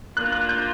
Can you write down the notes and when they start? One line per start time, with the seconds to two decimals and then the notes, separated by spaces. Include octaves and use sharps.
0.17 A#3 D4 F4 F#6
0.32 F#6
0.49 G6